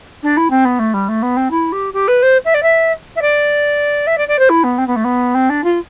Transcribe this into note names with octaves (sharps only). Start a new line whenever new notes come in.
D4
E4
C4
B3
A3
G3
A3
B3
C4
E4
G4
G4
B4
C5
E5
D5
E5
E5
D5
E5
D5
D5
C5
E4
B3
C4
B3
A3
B3
C4
D4
F4